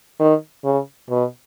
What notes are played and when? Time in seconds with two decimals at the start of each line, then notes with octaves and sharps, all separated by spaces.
0.20 D#3
0.65 C#3
1.10 B2